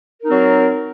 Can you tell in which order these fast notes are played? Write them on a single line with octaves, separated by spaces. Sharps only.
A#4 D#4 C4 F#3